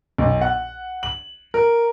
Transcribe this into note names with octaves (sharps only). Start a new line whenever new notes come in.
B1
F#5
F#7
A#4